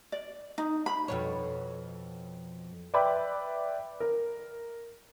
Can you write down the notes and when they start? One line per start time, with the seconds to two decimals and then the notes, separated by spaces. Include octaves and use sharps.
0.12 D5
0.58 D#4
0.86 B5
1.08 F2 B2 C#5
2.94 B4 D5 E5 G5 B5 D6
4.00 A#4